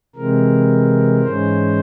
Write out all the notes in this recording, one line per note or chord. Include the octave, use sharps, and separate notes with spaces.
C3 E3 G#3 C4 A#4
G#2 E3 G#3 C#4 C5